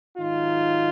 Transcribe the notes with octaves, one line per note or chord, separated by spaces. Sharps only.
G#2 D#3 F#3 D#4 F4